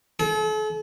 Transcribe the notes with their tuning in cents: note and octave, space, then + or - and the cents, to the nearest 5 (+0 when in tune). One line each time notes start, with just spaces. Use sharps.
A4 -45